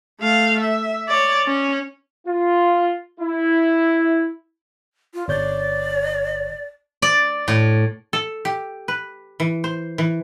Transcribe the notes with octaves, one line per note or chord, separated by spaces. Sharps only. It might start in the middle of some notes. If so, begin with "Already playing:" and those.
A3 F5
E5
C#5 D5
C#4
F4
E4
F4
G1 C#5 D5 G6
D5
A2
A4
G4
B4
E3
C5
E3